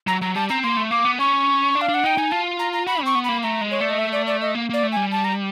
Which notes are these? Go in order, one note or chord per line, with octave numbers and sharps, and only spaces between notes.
F#3 A#5
F#3 A#5
G3 A5
C4 A#5
A#3 C6
A3
A#3 D6
B3
C#4 C#6
D4
F5
D4
F#5
D#4 G5
D#4 G#5
F4 A5
A#5
A#5
F#4 B5
C4 C#6
B3
A#3 B5
A3 A#5
G#3
C#5
A3 D5
D#5
E5
D5
D5
D#5
A#3
A#3 D5
A3
G3 G#5
A5
A#5